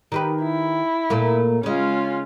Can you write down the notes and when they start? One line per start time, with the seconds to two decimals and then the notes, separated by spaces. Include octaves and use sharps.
0.12 D#3 G4 B4
0.42 E4
1.10 A#2 A3 A#3
1.63 C#3 G#3 C#4 F4